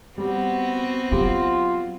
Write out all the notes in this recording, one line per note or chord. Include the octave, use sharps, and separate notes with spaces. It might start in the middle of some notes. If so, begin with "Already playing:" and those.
G3 B3 C4 F#4
F#3 F4 G4